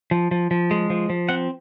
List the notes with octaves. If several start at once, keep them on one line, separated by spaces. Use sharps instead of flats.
F3
F3
F3
G#3
F3
F3
C4 F#5